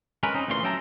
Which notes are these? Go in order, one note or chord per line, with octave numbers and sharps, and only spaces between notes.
G#3 C#4 A#4 B4
C4 C#4 D#4
D2 A#2 E3 C#4 E4 C6
F#3 C#4 E5 G5 A5 A#5